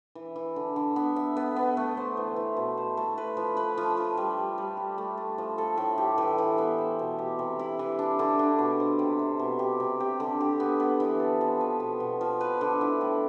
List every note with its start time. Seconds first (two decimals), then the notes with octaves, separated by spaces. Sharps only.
0.15 E3
0.36 E3
0.56 D3
0.76 D3
0.96 B3
1.16 E5
1.37 B3
1.56 B3
1.77 A3
1.97 C5
2.17 E3
2.36 E3
2.57 B2
2.77 C5
2.97 A3
3.18 B4
3.37 F3
3.57 B4
3.77 F3
3.97 F3
4.17 G3
4.37 G3
4.58 G3
4.77 G4
4.98 A3
5.17 A3
5.38 F3
5.58 A4
5.77 A2
5.98 G4
6.18 E3
6.38 E3
6.58 B3
6.78 C5
6.99 B2
7.19 G4
7.39 C3
7.59 E4
7.79 E3
7.99 D4
8.19 D3
8.39 D4
8.59 B2
8.80 C5
8.99 C3
9.19 C3
9.39 B2
9.59 G4
9.80 C3
10.00 G4
10.20 D3
10.41 G4
10.60 B3
10.80 B3
11.00 E3
11.20 A4
11.41 F3
11.61 B4
11.80 B2
12.00 B2
12.21 F3
12.41 B4
12.61 D3
12.81 E4
13.01 A2